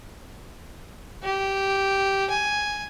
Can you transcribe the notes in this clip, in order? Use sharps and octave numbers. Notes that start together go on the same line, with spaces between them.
G4
G#5